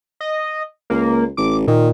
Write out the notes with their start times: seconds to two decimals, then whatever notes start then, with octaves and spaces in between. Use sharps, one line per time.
0.21 D#5
0.90 C#2 A#3
1.37 A1 D6
1.67 A#2 D#3